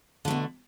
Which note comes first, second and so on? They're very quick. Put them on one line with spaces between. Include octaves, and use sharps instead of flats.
D3 A3 B2